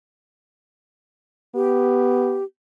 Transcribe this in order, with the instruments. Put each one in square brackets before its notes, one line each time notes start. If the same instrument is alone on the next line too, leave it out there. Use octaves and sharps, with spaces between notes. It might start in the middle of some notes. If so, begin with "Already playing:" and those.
[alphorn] B3 [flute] G4